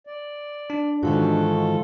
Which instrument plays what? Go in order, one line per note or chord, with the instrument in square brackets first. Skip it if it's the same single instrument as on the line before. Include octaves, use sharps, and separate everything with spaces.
[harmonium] D5
[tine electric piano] D4
[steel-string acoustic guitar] G#2 D#3 E3 [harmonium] F4 A4 [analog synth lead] F#4